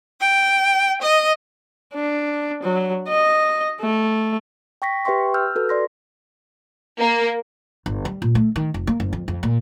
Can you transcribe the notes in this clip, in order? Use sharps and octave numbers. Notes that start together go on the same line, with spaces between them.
G5
D#5
D4
F#3
D#5
A3
G5 C#6 A#6 B6
G4 B4 E5 G5 C6 C#6
E6 F6 G6
F#4 A4 B4
D5 C6 A#6
A#3
G1
G3
A#2
A3
D#3
F1
A#3
F#1
F2
F2
A#2